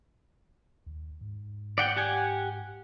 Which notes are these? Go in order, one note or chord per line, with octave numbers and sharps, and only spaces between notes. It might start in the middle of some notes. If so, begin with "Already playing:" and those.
D#2
G#2
D5 F#5 G5
G4 F#5 G#5